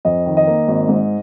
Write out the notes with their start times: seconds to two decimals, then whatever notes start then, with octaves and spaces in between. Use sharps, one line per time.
0.05 F2 D#5
0.26 D#3
0.37 D#5
0.47 A#3
0.68 G#1
0.89 G#2